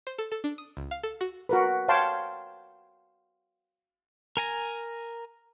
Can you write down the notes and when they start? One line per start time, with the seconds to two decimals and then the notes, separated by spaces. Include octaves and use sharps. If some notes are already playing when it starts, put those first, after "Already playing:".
0.07 C5
0.18 A4
0.32 A4
0.44 D4
0.58 D#6
0.77 C#2
0.91 F5
1.03 A4
1.21 F#4
1.49 F#4 A#4 B4
1.88 C#5 F5 G5 A5 C6
4.37 A#4 G#5 A#5